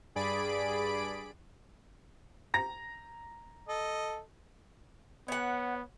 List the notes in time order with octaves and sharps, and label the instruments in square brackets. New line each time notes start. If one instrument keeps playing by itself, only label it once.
[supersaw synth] G2 G#4 D5 B5 D7
[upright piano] A#5 A#6
[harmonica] A4 D#5
[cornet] B3 [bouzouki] C#5 F#5